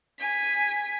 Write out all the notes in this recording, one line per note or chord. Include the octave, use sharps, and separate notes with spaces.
G#5 B6